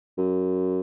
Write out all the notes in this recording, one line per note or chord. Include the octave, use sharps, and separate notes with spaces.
F#2